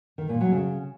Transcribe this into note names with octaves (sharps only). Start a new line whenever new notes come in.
D#3
A#2
F#3
C#3